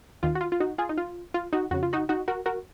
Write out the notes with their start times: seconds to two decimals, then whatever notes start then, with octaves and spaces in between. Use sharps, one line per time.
0.23 D#2 D#3 F4
0.35 F#4
0.41 F4
0.52 F4
0.60 D#4 F#4
0.78 F4 G#4
0.89 D#4
0.98 F4
1.34 F4
1.53 D#4 F#4
1.71 F2 C#3 F#4
1.83 F4
1.93 D#4 F#4
2.09 D#4 F#4
2.28 F#4 A#4
2.46 F#4 A#4